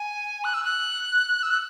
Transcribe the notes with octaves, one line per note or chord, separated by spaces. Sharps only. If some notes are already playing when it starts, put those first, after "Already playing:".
Already playing: G#5
F#6
E6
F#6
E6
F#6